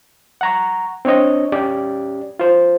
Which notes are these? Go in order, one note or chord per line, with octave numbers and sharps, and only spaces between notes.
F#5 A#5 C#6
C4 D4 C#5 D#5
C#4 G4 D5
F4 C5